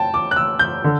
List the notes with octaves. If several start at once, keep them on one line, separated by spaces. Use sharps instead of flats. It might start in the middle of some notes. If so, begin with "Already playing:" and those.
Already playing: G5 A5
D6
F#6
E6
G6
D3